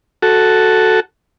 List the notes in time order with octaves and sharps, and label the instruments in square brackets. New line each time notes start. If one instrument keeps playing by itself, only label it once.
[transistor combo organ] F#4 A4